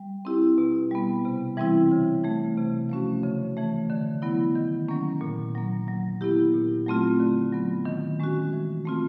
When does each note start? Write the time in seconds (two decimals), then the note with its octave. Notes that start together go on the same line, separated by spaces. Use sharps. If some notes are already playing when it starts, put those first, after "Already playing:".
Already playing: G3
0.25 C4 E4 G4
0.58 B2
0.91 G3 B3
1.25 C3
1.57 E3 G3 C4 E4
1.91 C#3
2.24 E3 A3
2.58 C3
2.89 F3 A3 C#4 F#4
3.23 C#3
3.57 E3 A3
3.90 D3
4.22 F#3 B3 E4
4.55 D#3
4.88 F#3 A#3 C#4
5.21 A#2
5.55 F#3 A#3
5.88 F#3
6.21 B3 E4 G4
6.54 A#2
6.86 F#3 A3 C4 F4
7.20 D3
7.52 F#3 B3
7.85 D#3
8.20 G#3 C#4 F#4
8.53 E3
8.85 A3 C4 F4